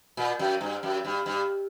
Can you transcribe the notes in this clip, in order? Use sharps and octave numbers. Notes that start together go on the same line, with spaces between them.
A#2
F#2
G2
F#2
G2
G2